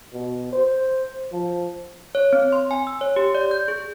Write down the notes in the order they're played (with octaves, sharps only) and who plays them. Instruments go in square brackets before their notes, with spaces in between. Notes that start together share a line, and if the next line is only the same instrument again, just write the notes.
[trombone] B2
C5
F3
[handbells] C#5
C4
C6
G#5
E6
C#5
G4
D5
G6
G#4